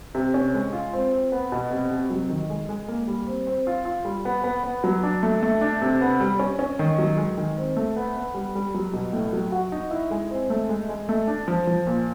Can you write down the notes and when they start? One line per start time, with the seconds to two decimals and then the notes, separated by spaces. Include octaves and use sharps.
0.15 C3
0.34 C#4
0.54 G#3
0.73 F4
0.93 C4
1.12 C4
1.32 B3
1.52 B2
1.70 C3
1.91 C3
2.10 F#3
2.30 D#3
2.50 G#3
2.69 G#3
2.88 A#3
3.08 G3
3.27 C4
3.47 C4
3.67 F4
3.85 F4
4.05 G3
4.25 B3
4.44 B3
4.63 B3
4.84 F#3
5.03 D4
5.23 A3
5.43 A3
5.61 D4
5.81 C3
6.01 B3
6.20 G3
6.39 C#4
6.59 C#4
6.79 D#3
6.98 F#3
7.17 G#3
7.38 D#3
7.57 C4
7.76 A3
7.96 B3
8.16 B3
8.35 G3
8.55 G3
8.74 F#3
8.93 B2
9.13 A2
9.33 F#3
9.52 F#4
9.72 D#4
9.91 E4
10.11 G#3
10.31 C4
10.50 A3
10.69 G#3
10.89 G#3
11.09 A3
11.28 D4
11.48 F3
11.67 F3
11.87 A#2